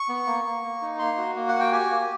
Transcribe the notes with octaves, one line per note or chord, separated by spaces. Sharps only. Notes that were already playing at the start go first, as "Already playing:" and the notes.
Already playing: C#6
B3
A#3
A#3
A#3
D#4
A#3 C6
F#4
A#3
F#4 F#5
G5
G4 G#5
A#3